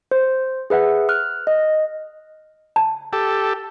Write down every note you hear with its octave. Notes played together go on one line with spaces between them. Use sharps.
C5
G#4 B4 E5 F#5
F6 F#6
D#5
A5
G4 A4